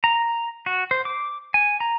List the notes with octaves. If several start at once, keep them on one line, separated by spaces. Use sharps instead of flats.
A#5
F#4
C5
D6
G#5
A#5